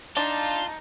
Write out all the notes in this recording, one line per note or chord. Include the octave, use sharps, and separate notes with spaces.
D4 D#4 F4 A5